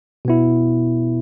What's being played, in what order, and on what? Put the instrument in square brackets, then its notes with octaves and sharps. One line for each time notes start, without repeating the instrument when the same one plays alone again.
[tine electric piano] B2 B3 E4